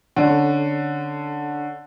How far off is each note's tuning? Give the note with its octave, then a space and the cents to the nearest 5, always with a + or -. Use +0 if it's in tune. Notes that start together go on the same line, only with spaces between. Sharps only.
D3 +0 C#4 +0 A4 -25